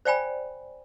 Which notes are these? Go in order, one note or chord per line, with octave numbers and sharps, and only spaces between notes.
C5 D5 F5 G5 G#5 B5